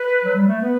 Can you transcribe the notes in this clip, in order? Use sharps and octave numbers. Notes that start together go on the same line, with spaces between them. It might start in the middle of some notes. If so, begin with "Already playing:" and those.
Already playing: B4
F#3
G3
A3
B3 B4